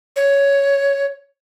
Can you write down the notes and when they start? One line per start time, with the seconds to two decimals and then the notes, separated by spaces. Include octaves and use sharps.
0.16 C#5